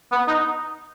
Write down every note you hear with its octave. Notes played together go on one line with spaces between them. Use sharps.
B3
D#4